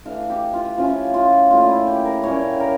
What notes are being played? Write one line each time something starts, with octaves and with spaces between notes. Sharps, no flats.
E3 A3 D4 F5
G4
F4
F3 C#4 E4 F4
F4
A#2 A3 E4 F4
E4
G4
A#4
A#2 G3 A#3 C#4 C#5
A#4